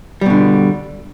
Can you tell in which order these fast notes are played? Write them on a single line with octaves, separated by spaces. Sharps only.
G3 B2 D3